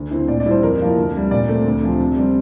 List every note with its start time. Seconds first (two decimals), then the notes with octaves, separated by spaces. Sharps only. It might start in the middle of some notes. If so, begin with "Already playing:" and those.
Already playing: D2
0.11 D3 A3 C4 E4
0.28 A#2 D5
0.40 D5
0.45 G3 C4 E4
0.51 C5
0.62 F2 A#4
0.80 C3 F3 A#3 E4
0.96 D2
1.14 C3 G3
1.31 A#2 D5
1.48 A3 C4
1.66 D2
1.83 C3 F3 C4
2.00 C3
2.17 G3 C4